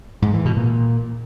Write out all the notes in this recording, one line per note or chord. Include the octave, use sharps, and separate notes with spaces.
G#2
E3
B2
A#2